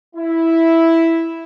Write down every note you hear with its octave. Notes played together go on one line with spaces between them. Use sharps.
E4